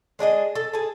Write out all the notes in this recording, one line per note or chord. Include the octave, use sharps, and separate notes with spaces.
G#3 D4 G#4 D#5
A4
G#4 A5